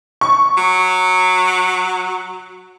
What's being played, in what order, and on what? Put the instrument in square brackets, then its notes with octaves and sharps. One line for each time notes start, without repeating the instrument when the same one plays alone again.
[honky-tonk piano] C#6
[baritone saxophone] F#3